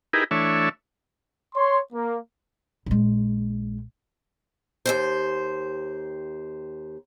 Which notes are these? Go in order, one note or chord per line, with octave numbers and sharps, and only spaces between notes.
D#4 E4 G4 G#4 A#4 B4
E3 A3 D4 C#5 E5
C#5 C6
A#3
A#1 G#3
D#2 A#2 C5